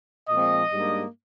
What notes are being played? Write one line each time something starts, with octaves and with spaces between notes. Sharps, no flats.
A#2 F3 G#3 C4 D#5
G#2 G3 A#3 D4